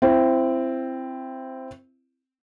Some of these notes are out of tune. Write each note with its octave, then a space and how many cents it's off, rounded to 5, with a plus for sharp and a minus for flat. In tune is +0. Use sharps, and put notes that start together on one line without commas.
C4 +0 E4 +25